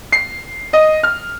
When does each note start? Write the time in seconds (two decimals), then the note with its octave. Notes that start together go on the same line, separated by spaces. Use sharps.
0.12 C7
0.73 D#5
1.03 F6